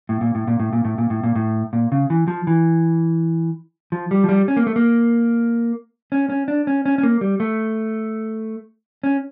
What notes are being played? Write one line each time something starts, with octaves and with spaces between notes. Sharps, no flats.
A2
A#2
A2
A#2
A2
A#2
A2
A#2
A2
A#2
A2
A#2
C#3
E3
F3
E3
F3
G3
F3
G3
C#4
A#3
A3
A#3
C#4
C#4
D4
C#4
C#4
C#4
A#3
G3
A3
C#4